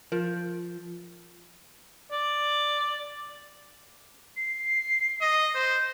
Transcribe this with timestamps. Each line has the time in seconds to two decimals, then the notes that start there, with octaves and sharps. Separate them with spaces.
0.12 F3 F4 A#4
2.12 D5
4.37 C7
5.21 D#5
5.55 C5 G6